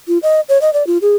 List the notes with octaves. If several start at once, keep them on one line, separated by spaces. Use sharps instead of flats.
F4
D#5
C#5
D#5
D5
F4
G#4